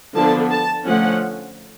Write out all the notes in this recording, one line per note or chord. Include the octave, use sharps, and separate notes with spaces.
D3 F3 B3 D4 A5
A5
D3 F3 A3 C#4 F#5